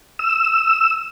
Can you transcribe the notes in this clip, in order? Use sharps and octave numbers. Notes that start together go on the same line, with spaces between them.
E6